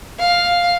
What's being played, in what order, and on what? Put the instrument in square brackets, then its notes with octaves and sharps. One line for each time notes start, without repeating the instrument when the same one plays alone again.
[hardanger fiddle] F5